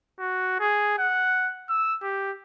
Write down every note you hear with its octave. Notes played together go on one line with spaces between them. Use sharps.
F#4
G#4
F#5
E6
G4